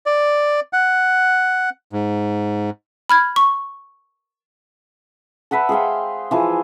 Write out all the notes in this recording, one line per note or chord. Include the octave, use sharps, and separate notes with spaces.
D5
F#5
G#2
B5 F6 G#6
C#6
B4 E5 F#5 A5
G#4 C5 F5 G5
E3 F3 G#4